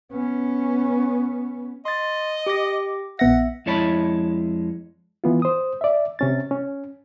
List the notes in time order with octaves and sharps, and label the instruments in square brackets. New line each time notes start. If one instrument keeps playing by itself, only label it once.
[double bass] B3 C#4
[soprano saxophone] D#5 [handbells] C6 A6
[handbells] G4 D6 A#6
[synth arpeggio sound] A#1 B3 A#6 [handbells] E5 [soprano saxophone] F#5
[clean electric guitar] F2 G#3 E4 C#5 A5 B5
[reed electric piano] E3 B3 F4
C5 D#6
D5 E5
C3 C#4 A6
C#4